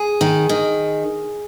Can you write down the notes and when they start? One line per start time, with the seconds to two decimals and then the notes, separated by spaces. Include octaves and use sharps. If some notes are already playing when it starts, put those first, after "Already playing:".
Already playing: G#4
0.21 D#3
0.49 D#3